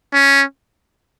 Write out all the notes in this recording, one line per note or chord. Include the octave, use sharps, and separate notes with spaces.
C#4